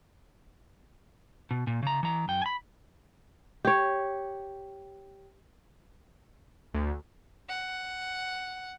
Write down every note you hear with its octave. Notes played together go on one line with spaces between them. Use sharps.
B2
A#2
C#3 A#5
E3 A#5
F#2 G5
G#5 B5
G4 C#5
D2
F#5